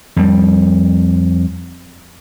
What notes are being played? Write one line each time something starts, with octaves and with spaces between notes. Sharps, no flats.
F2 G3